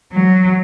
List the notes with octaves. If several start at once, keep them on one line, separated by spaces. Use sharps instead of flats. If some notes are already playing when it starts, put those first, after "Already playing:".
F#3